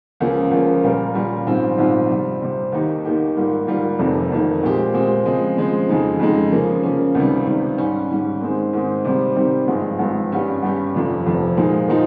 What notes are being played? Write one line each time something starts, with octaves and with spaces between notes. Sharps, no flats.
C#2 C#3 F3 A#3 C#4
C#2 C#3 F3 A#3 C#4
A#2 G3 C#4 F4 A#4
A#2 G3 C#4 F4 A#4
A#1 G#2 G3 C4 F4
A#1 G#2 G3 C4 F4
C3 G3 C4
C3 G3 C4
D#2 D#3 A#3 D#4 G4
D#2 D#3 A#3 D#4 G4
G#2 G3 A#3 F4
G#2 G3 A#3 F4
F1 F2 C3 D#3 A#3
F1 F2 C3 D#3 A#3
A#2 G#3 C4 G4
A#2 G#3 C4 G4
C#3 F3 G#3 C4
C#3 F3 G#3 C4
F2 C#3 G#3 D#4
F2 C#3 G#3 D#4
C#3 F3 A#3 C#4
C#3 F3 A#3 C#4
C#2 C3 D#3 G3
C#2 C3 D#3 G3
G#2 G3 C#4
G#2 G3 C#4
G#2 D#3 G#3 C4
G#2 D#3 G#3 C4
C3 D#3 G3 C4 G4
C3 D#3 G3 C4 G4
G#1 G2 F3 G#3
G#1 G2 F3 G#3
G2 G3 C#4 G4
G2 G3 C#4 G4
F1 F2 C3 F3
F1 F2 C3 F3
A#2 F3 G#3 D#4
A#2 F3 G#3 D#4